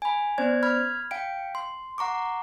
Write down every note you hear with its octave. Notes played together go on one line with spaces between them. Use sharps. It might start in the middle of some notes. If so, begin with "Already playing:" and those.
G#5 B5
B3 C#4 C5 D5 G#6
B5 F6 G#6
F5 G5 D7
C6
F#5 A#5 C#6 D6